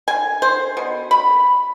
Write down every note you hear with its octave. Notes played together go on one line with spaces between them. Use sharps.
G#5
C5
B2
B5